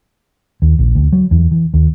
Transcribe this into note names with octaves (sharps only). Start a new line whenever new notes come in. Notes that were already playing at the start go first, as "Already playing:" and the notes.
D#2
A#1
D2
F#3
E2
E3
D#2